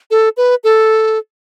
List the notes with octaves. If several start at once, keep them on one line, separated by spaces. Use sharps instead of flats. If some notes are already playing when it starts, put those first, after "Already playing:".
A4
B4
A4